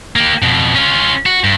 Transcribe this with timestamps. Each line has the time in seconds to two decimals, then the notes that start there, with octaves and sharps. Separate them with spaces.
0.16 A#3 G4
0.42 F2 B2
0.75 C#4 F4
1.26 F#4
1.44 G2